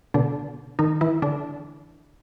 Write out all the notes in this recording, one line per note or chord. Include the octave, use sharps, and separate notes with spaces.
B2 D3 D4
D#3 D#4
E3 E4
D3 D4